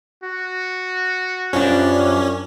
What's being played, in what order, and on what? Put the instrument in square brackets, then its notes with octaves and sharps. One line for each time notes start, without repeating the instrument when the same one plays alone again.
[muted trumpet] F#4
[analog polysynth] F#2 D4 [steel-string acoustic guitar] F3 G3 [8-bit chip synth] C#4